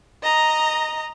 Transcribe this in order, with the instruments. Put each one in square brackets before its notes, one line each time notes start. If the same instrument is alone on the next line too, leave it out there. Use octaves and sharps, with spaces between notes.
[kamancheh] D#5 A#5